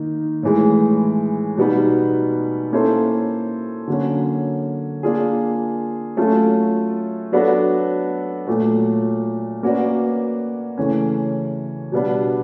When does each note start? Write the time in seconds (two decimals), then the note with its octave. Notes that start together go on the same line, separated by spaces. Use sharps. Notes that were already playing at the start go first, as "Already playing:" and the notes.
Already playing: D#3 A#3 D#4
0.43 A2 E3 G#3
1.57 B2 G3 B3 D#4
2.72 A#3 C#4 E4 A4 C5
3.88 D3 F#3 A#3 C#4
5.03 A#3 D4 F4 G#4
6.17 F#3 A3 C#4 F4 A4
7.32 F#3 B3 D4 F#4 A4
8.47 A#2 F#3 A3
9.63 A#3 C#4 F#4 B4 D5
10.78 C#3 E3 A3 C#4
11.92 B2 G3 B3 D4